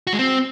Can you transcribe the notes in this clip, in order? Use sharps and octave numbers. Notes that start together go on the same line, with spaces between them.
F#4
G#3
C4